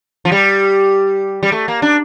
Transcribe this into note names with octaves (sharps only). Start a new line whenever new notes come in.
F3
G3
G3
A3
A#3
D4